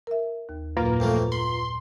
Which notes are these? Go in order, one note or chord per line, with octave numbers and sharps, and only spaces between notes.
A#4 E5
D#2
F#2 A#2 F#3 A#3 F4 B4 A#5
F2 E3 A3
B5 C6